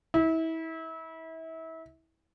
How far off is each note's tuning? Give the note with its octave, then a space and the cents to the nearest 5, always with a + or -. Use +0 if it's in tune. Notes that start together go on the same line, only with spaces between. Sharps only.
E4 -30